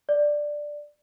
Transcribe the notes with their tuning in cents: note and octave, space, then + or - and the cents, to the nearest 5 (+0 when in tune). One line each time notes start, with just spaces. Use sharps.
D5 +5